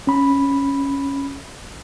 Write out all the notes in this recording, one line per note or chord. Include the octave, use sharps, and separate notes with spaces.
C#4 B5